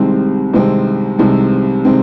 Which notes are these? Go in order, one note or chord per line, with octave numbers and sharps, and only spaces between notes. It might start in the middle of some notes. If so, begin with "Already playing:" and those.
Already playing: C2 C3 D#3 G#3 C4
C2 C3 D#3 G#3 C4
C2 C3 D#3 G#3 C4
C3 D#3 G#3 C4